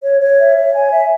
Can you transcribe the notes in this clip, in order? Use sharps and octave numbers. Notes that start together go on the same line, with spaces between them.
C#5
C#5
E5
C#5
G#5
E5